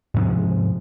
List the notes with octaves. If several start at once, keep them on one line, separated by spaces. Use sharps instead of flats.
G#2 C3 F3 G#3